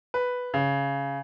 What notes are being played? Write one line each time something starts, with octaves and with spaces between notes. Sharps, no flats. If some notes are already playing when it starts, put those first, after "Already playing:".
B4
C#3